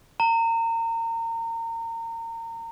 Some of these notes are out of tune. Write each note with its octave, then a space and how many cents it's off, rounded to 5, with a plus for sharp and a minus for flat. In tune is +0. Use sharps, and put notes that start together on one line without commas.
A#5 -30